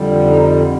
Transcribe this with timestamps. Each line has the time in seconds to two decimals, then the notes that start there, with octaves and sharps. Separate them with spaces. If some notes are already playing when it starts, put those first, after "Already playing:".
Already playing: F2 D3 G3
0.25 D#4